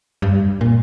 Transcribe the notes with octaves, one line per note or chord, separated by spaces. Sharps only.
G2
A#2